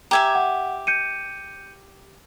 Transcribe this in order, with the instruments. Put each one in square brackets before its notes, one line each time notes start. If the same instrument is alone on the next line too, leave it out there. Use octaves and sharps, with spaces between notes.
[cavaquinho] G4 E5 G#5 [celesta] A#5 G#6
[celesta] F#5
G6 C#7 D#7